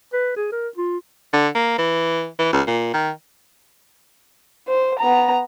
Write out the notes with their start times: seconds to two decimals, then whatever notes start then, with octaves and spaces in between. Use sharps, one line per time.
0.13 B4
0.37 G#4
0.52 A#4
0.77 F4
1.33 D3
1.55 A#3
1.78 E3
2.39 E3
2.53 C#2
2.67 A#2
2.93 D#3
4.68 C5
4.99 B3 A#5